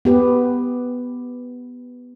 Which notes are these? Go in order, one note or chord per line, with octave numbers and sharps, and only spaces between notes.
B3 G4 B4